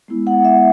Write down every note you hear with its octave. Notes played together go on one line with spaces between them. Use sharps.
G#3 B3 E4
F#5
E5